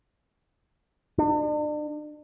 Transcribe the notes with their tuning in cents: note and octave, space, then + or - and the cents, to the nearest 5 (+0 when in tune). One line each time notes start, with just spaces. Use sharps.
D4 +40